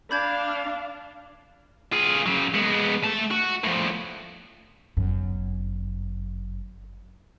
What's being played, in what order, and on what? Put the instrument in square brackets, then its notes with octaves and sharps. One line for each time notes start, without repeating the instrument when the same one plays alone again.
[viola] D4 F5 [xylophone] B5 G6 G#6
[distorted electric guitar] F4 G#4
C#3 F#3
G#3 B3
A3 A5
F#4
A2 F3
[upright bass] G1 F#2